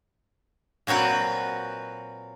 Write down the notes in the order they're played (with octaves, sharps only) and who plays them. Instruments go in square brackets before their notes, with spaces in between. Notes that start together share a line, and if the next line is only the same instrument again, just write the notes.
[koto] A#2 F#3 C4 F#4 B4